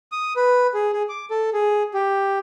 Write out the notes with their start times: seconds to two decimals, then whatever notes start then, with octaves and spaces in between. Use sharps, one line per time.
0.12 D#6
0.36 B4
0.74 G#4
0.93 G#4
1.09 D6
1.30 A4
1.53 G#4
1.94 G4